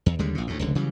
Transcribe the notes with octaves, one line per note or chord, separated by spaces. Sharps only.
E2
D#2 D3 G3 G#3
A#1 A#2
D2 A2
F1 C#2 D3
C#3 E3 F#3 G3